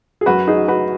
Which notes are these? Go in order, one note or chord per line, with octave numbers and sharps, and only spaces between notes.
G#4
F#2 F#3 F#4 B4
D#4 G#4
F#4 B4